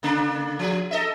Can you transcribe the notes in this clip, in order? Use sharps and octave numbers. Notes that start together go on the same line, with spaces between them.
C#3 A#3 D4
F3 G#4
A4 D#5 E5